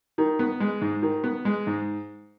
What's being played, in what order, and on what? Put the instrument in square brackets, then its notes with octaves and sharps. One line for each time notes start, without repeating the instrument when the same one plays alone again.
[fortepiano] D#3
B3
G#3
G#2
D#3
B3
G#3
G#2